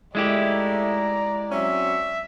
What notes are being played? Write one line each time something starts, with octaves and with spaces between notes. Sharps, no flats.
G#2 G#3 A3 E4 G4 D5
A#5
F#3 C4 C#4 E5